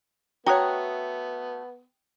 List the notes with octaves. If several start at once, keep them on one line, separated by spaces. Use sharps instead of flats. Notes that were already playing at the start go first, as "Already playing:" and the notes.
A3 B3 F#4 C#5 G5 A#5 D#6 F#6